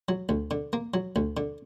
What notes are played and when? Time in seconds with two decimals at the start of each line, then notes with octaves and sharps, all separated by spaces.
0.09 F#3
0.29 D2
0.51 D3
0.73 A#3
0.94 F#3
1.16 D2
1.37 D3